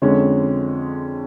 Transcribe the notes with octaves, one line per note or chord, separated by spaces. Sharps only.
F2 D3 G#3 C#4